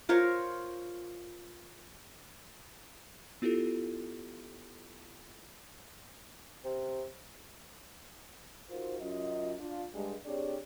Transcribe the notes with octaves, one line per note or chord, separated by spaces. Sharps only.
F4 A#4 C5 C#5
B3 E4 F4 G4 A4
C3
D#4 F4 F#4 A#4 C5
F#2 F4 D#5
D4 F4
G2 G#3
C4 D4 G4 G#4 C#5 D5